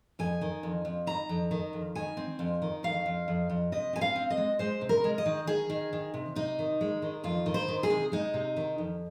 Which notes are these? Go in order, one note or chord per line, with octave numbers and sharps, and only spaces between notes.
F2 G#5
D#3
F2
F2
D#3 A#5
F2
D#3
F2
D#3 G#5
C4
F2
D#3
F2 F5
F2
F2
F2
C3 D#5
C4 G#5
F5
C4
D#5
G#3
G#3 C5
C3
A#4
G#3
D#5
D#3
D#3 G#4
D#3
D#3
C3
C3 D#4
D#3
G#3
D#3
F2 F4
D#3
C5
D#3
G#4
C3
G#3 D#4
C3
D#3
F2